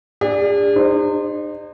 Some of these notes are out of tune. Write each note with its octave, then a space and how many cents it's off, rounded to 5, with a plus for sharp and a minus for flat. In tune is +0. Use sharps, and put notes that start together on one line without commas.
D4 +0 G#4 -45 D5 +0
D#4 -40 C5 +0